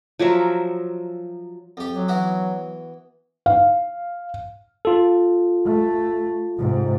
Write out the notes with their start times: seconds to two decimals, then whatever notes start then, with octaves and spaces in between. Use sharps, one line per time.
0.19 F3 F#3 A#4 E5
1.77 F2 G4
1.89 F#3
2.08 E3 B3 F#4
3.46 F5
4.85 F4 A4
5.65 A3
6.58 G#2 C3